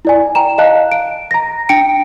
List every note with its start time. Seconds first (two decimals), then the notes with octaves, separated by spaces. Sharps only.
0.05 E4 D5 G#5
0.35 G5 A#5 E7
0.58 D#5 F5 A5 F#6
0.92 D7
1.31 A#5 A#6
1.69 D4 G5 C#7 D7